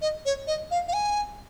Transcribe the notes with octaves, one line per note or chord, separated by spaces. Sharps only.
D#5
C#5
D#5
F5
F5
G#5